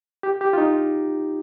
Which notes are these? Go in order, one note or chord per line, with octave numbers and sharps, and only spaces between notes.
G4
G4
F4
D#4